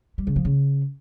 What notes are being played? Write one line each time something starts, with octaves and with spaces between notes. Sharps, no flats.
G3
C#3
F3
C#3